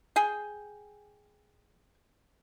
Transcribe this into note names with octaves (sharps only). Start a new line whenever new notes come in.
G#4 G5